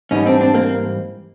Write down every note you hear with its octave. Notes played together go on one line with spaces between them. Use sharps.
G#2 E3 G3 C#4 D#4
C4 D4
C4 D4
A#3 C4